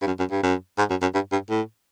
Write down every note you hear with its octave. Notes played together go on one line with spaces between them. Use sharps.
G2
F#2
F#2
G2
F#2
G#2
F#2
F#2
G2
G2
A2